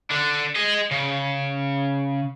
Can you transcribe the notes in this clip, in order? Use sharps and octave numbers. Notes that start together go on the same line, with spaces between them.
D3 D4
G#4 D#5
C#3